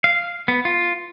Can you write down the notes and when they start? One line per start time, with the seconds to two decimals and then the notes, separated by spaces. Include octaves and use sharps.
0.04 F5
0.48 B3
0.65 F4